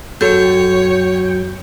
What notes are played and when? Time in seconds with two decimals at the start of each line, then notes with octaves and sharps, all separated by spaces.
0.21 F#2 F#3 F#4 A4 C#5 G5 G6